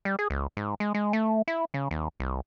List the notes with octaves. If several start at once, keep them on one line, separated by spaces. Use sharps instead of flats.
G3
G#4
C#2
G#2
G#3
G#3
A3
E4
C#3
D#2
C2